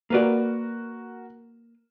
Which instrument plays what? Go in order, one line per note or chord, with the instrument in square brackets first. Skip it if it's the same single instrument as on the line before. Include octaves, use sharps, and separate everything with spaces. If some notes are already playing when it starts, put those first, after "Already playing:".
[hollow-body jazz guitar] A#3 B4 D5 [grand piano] F#4 A#4